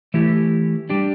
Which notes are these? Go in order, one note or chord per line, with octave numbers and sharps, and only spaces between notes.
E3 A3 E4 G4
G3 D4 G4